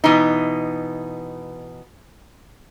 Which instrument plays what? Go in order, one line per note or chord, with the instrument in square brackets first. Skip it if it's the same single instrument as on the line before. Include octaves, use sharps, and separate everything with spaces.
[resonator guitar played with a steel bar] B2 E3 D#4